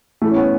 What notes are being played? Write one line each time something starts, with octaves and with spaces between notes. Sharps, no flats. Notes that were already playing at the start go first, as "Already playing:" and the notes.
E3 A3
C#4
B3